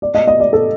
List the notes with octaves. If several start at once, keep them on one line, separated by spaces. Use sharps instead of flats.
D5
D#5
D#5
D5
A4